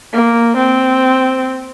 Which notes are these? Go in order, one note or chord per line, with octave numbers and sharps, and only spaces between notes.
A#3
C4